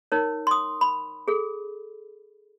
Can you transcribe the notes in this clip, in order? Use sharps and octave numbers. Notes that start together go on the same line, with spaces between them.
D#4 A#4 C#5
C6 D#6
B5
G#4 A4